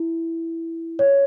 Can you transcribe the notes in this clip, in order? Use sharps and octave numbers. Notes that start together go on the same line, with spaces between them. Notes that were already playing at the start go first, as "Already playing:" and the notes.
Already playing: E4
C#5